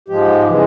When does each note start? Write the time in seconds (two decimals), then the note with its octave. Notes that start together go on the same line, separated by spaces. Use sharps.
0.08 G#2 F3 G#3 G4
0.47 C#3 E3 G#3